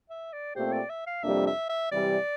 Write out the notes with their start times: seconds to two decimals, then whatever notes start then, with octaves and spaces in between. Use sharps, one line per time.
0.10 E5
0.33 D5
0.55 A#2 A3 C4 G4 C5
0.73 D5
0.89 E5
1.07 F5
1.23 F2 C3 G3 A#3 D4 E5
1.47 E5
1.69 E5
1.92 C3 E3 G3 D5